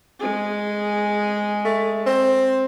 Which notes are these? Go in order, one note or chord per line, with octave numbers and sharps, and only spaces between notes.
G#3 G#4
A3
C4